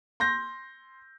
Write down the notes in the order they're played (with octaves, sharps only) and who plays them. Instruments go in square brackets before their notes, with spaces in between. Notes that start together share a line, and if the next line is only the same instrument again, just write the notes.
[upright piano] C6 G6 A#6